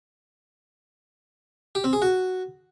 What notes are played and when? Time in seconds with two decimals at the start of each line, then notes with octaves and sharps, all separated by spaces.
1.75 G4
1.84 C4
1.93 G#4
2.02 F#4